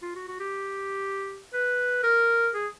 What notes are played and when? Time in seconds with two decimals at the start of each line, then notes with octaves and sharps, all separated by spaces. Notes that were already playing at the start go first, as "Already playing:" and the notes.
0.02 F4
0.15 F#4
0.28 F#4
0.40 G4
1.53 B4
2.03 A#4
2.54 G#4